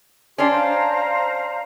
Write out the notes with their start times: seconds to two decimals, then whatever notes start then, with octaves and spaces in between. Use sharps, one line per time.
0.38 C#4 D4 G4 D5 C6
0.50 C5 F5 A#5